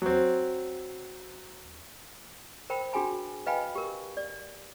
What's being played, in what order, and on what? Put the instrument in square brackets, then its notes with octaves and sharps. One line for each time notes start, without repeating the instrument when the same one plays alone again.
[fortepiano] F#3 C4
[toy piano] A#4 C5 G5 B5
D4 F#4 G#4 G5 G#5 B5
B4 D#5 F5 G5 G#5 B5
G4 A#4
D5